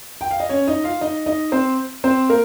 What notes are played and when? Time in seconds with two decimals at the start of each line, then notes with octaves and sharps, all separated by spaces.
0.21 G5
0.31 F5
0.40 D#5
0.49 C#4 C#5
0.67 D#4 D#5
0.84 F4 F5
1.01 D#4 D#5
1.26 D#4 D#5
1.52 C4 C5
2.04 C4 C5
2.29 A#3 A#4